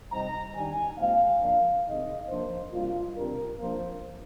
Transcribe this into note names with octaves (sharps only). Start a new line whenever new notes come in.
C3 G3 C4 D#4 A#5
D#3 G3 D4 G#5
A#2 G#3 C4 D#4 F5
F3 A#3 D4
C3 D#3 G#3 D#4 D#5
F3 A#3 D4 C5
C3 G3 A#3 D4 F4
C3 G3 D4 A#4
F3 A#3 D4 C5